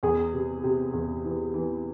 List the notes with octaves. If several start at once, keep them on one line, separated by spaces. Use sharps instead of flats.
E2 G#4
C3
C3
E2
E3
E3